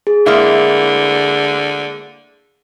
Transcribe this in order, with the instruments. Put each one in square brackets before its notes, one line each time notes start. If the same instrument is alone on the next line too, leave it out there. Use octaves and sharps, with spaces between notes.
[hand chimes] G#4
[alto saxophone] D3 [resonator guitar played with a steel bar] G#3 A#3 E4